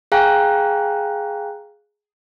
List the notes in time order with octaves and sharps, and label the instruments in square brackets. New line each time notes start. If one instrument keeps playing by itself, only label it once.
[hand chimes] G#4 F5 G5 G#5 A#5 F#6